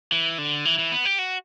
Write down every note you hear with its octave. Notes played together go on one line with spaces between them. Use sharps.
E3
D3
E3
E3
B3
G4
F#4